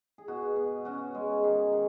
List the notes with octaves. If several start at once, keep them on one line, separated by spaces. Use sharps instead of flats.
G#4
B2 F#4
B2
C#4 F#4
G#3
D#3 G#4
D#3